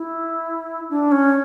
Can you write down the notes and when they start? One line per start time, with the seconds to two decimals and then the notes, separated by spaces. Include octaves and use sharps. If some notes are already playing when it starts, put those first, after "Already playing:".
Already playing: E4
0.90 D4
1.12 C#4